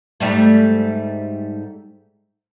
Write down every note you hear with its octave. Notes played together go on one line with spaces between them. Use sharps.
G#2 G3 A3